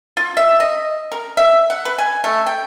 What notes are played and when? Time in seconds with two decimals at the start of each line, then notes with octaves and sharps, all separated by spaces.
0.17 F4
0.37 E5
0.60 D#5
1.12 A#4
1.37 E5
1.70 F#5
1.85 B4
1.98 G#5
2.24 A3
2.46 G5